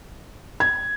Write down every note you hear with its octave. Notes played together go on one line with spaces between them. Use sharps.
G#6